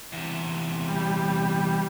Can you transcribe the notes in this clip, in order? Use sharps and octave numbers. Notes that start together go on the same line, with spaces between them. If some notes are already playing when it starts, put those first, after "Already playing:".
E2 C3
G3